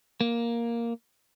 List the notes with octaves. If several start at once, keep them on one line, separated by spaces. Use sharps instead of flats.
A#3